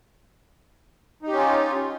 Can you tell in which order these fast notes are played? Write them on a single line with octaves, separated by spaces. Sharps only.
D#4 G4 C#4 F4